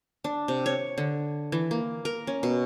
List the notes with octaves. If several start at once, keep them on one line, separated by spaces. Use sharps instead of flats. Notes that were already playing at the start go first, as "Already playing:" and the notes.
D4
C3
C#5
D3
E3
A#3
A#4
C#4
B2